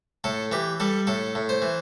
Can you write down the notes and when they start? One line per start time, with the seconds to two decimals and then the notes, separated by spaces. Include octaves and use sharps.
0.24 A2 A4
0.52 E3 G4
0.80 G3 A4
1.07 A2 A4
1.35 A2
1.49 C5
1.62 E3